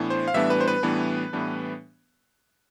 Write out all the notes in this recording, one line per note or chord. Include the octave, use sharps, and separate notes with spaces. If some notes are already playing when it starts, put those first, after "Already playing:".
Already playing: A2 E3 B3 D4
C5
F5
A2 E3 G3 B3 D4 E5
B4
C5
B4
A2 E3 G3 B3 D4
A2 E3 G3 B3 D4